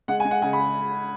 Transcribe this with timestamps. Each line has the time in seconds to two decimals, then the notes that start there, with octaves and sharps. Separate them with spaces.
0.08 G#3 F#5
0.20 G#5
0.25 G#3
0.31 F#5
0.42 C#3 G#5
0.53 B5